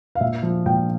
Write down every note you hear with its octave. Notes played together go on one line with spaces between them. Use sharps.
F5
A#2 E5
F3
A#2 G5